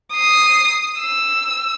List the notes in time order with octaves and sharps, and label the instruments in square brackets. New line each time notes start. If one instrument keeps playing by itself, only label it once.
[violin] D#6 C7
E6